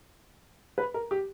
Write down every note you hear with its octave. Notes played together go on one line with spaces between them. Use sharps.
B4
A#4
G4